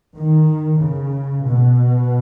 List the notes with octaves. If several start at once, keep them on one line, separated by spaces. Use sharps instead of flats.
D#3
C#3
B2